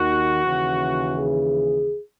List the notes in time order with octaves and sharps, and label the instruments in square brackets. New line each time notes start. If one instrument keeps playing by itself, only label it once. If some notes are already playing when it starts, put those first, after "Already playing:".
Already playing: [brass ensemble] D#2 D#3 F#4
D#2 C#3 E3
G#4